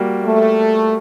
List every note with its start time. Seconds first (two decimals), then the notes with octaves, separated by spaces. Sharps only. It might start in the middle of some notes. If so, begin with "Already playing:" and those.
Already playing: G3 A#3 F#4
0.24 A3